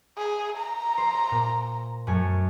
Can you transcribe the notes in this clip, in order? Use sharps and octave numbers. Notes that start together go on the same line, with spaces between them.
G#4
A#5
C5
A#2
F#2 A3 G#5